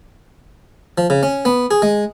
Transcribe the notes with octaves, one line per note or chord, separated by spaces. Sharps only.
F3
C#3
C#4
B3
G#4
G#3